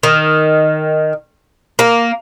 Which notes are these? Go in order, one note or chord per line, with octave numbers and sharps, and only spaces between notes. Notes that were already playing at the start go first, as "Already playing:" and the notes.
D#3
A#3